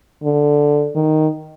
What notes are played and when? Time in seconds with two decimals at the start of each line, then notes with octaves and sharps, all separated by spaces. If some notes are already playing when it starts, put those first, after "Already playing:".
0.24 D3
0.95 D#3